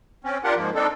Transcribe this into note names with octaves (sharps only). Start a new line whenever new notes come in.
C4 C#4
D4 F4 G4 A#4 F#5
G#2 F3 A#3
C4 D4 D#4 A4